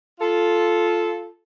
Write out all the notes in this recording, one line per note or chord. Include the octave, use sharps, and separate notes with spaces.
F4 A4